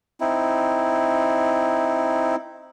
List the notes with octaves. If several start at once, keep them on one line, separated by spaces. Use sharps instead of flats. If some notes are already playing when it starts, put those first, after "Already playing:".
C4 D#4 E4